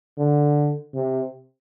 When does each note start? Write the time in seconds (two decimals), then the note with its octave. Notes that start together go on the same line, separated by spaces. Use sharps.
0.18 D3
0.94 C3